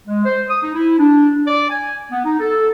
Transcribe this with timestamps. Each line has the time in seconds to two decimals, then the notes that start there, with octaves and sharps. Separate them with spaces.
0.08 G#3
0.26 C5
0.49 D#6
0.63 D#4
0.75 E4
0.99 D4
1.47 D5
1.70 G#5
2.12 B3
2.26 D#4
2.40 A4